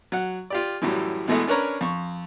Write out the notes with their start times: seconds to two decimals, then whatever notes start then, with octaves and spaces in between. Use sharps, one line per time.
0.12 F#3 F#5
0.50 F4 G4 D5
0.82 F#2 A2 E3 F#3 G3
1.28 B2 E3 G#3 A3 B3 E4
1.47 C#4 D4 A#4 B4 C#5 A#5
1.81 F2 C#6